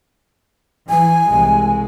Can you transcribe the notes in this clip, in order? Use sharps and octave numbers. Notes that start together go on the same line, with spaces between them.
E3 G#5
C2 G#3